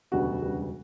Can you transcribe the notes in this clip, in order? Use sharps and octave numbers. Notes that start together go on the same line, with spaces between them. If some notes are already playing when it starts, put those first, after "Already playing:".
E1 D2 C#3 G3 B3 F#4
E1 D2 C#3 G3 B3